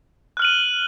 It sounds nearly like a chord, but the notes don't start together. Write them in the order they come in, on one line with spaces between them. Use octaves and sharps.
F#6 F6 F#7 D#7